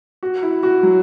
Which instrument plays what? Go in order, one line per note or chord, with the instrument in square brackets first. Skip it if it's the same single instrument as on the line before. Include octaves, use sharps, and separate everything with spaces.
[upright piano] F#4
E4
F#4
F#3